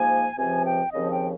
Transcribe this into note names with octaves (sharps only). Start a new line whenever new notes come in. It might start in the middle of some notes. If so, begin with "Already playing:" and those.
Already playing: G#2 F3 A#3 G#5
C#2 C3 F3 C4 G#5
G5
D#2 C#3 F3 C4 D#5
G5